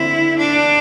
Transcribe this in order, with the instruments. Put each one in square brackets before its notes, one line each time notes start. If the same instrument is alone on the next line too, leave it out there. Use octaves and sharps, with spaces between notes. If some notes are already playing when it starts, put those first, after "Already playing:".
Already playing: [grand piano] D3 C4 [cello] E4
[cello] D4